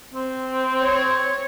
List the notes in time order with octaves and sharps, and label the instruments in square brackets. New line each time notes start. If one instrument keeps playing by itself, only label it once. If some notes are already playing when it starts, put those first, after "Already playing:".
[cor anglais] C4
[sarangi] C#5